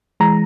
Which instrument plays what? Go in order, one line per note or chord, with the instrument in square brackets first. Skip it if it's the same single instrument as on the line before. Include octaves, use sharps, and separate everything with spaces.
[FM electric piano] E3 G#3 A#5